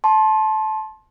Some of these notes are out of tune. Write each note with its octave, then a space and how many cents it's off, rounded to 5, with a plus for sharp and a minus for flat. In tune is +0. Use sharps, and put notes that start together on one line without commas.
A5 -20 C6 +25